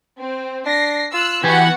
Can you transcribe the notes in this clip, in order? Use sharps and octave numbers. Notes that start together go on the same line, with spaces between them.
C4
D4 A#6 C7
F4 E6 F#6
E3 B3 F#4 G4 B4 F#5 G#5